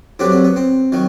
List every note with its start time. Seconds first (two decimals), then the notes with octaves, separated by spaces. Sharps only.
0.19 G2 D3 F#3 C4 D4
0.32 C4
0.44 B3
0.56 C4
0.92 D#3 F#3